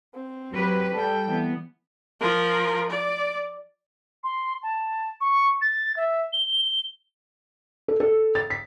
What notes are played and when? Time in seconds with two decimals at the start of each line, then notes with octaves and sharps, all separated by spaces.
0.15 C4
0.53 F#3 G4 B4
0.94 G3 A4 G5
1.27 E3 B3
2.21 F3 A#4
2.90 D5
4.24 C6
4.63 A5
5.21 C#6
5.62 A6
5.97 E5
6.33 G7
6.64 G7
7.88 A4
8.00 A4
8.35 A6
8.50 B6